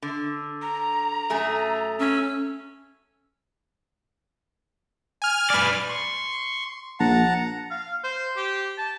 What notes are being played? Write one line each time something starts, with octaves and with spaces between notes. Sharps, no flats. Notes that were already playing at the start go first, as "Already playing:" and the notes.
D3
A#5
F#2 A3 G#4
C#4 E6
G#5 F6
B4 D5
C6 C#6
A#1 F#5 A5 A#5
F5
C5
G4
A5